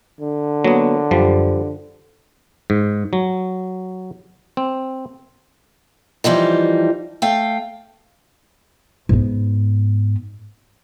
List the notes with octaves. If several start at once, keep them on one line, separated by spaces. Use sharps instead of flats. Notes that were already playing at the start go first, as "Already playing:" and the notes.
D3
F#3 A#3 B3
F#2 F3 G3
G#2
F#3
C4
E3 F3 G3 D#4
A3 F5 G5
G#2 B3